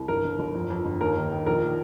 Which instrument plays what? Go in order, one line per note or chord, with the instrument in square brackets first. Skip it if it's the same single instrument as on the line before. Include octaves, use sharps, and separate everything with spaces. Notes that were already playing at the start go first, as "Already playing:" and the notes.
Already playing: [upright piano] C2
G1 A#4
G1
G1
F2
F2
G1
D#2 A#4
D#3
D#3
A#1 A#4
A#2